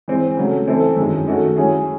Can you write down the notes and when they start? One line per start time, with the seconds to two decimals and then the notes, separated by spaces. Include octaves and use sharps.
0.08 E3 G#3 C4
0.37 C#3 F#3 A3
0.67 E3 C4 E4 A4
0.97 F#2 D#3 G#3
1.27 D#3 A3 C#4 F#4
1.57 F#3 C#4 E4 G#4